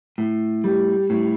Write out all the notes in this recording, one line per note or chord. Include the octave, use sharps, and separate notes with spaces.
A2
G3
A2